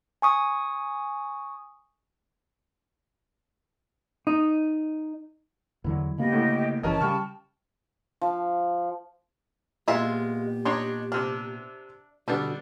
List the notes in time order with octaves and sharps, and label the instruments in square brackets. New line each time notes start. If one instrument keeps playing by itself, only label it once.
[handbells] G#5 C#6 D#6
[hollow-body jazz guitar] D#4
[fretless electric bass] E2 D3 F#3 [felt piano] E4
[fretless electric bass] C#3 A#3 B3 [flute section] G4 D#5
[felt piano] D2 A2
[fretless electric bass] G1 F2 E3 [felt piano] C#4 A#4 D#5 [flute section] A5
[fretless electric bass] C#3 G3 [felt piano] G5 C#6 F6
[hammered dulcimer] F3
[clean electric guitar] A#2 B3 [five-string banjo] G#3 F4 E5 [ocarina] G4
[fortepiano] D4 C#5 C6 [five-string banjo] D#4
[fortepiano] C3 F6 [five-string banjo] D4
[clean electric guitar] B2 D3 [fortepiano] G3 B3 D4 [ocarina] F#4 [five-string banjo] A4